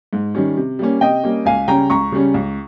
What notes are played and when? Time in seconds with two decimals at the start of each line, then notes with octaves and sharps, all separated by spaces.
0.13 G#2
0.35 D#3 G3 C#4
0.57 C3
0.79 G3 A#3 C#4
1.01 C3 D#5 G5
1.24 G3 A#3 C#4
1.45 C#2 F5 G#5
1.68 C#3 G3 C#4 G5 A#5
1.90 C#2 A#5 C#6
2.12 C#3 G3 C#4
2.34 C#2